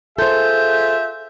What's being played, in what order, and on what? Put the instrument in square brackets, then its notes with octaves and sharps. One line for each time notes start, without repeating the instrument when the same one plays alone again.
[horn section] F4 G#4 E5 [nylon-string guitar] A4 C5 [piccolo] G6